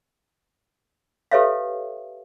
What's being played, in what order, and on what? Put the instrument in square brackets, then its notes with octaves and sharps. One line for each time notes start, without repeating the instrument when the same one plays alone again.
[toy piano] G4 A4 B4 C#5 E5 F5